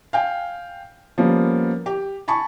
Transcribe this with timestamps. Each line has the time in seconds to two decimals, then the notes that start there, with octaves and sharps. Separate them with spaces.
0.13 F5 G5 G#5
1.18 F3 G3 A#3 B3 C#4
1.86 G4
2.28 G#5 A5 B5 C#6